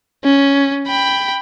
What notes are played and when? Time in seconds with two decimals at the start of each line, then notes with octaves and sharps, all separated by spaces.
0.24 C#4
0.87 G5 B5